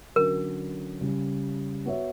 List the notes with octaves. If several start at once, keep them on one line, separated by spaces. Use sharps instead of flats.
D3 F#3 C#4 A#4
C#3 G3 C#4
B3 F#4 C#5 E5